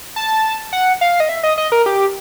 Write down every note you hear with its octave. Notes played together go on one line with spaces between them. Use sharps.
A5
F#5
F5
D#5
E5
D#5
D#5
A#4
G4